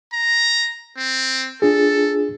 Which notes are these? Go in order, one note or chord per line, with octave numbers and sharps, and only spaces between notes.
A#5
C4
D4 F4 G#4 A4